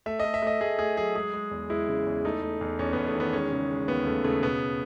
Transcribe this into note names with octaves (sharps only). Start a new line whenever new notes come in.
A3 E5
A3 D#5
E5
A3 D#5
A3 G#4
A3 G#4
F#3 G#4
G#3 G#4
G#3
E2
G#3 E4
C#3
E2
A3 D#4
A3
E2
E2 C#4
E2 B3
A3
D#3 B3
G#3 C#4
C#3
G#3
D#2 B3
C#3 A3
C#3 A3
B2 B3